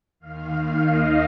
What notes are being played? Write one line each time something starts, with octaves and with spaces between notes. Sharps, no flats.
D#2 D#3 F5
D#5